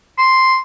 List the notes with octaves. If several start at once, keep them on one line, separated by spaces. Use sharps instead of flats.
C6